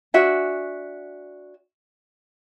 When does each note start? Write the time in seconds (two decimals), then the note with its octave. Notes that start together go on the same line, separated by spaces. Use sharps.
0.14 D4 F#4 E5 G#5